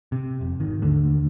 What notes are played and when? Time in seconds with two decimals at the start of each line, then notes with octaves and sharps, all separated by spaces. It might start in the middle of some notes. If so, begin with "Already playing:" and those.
0.12 C3
0.41 F1
0.60 G#1 D#3
0.82 D#2 D3 A3